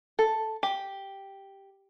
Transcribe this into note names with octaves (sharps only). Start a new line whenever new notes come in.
A4
G4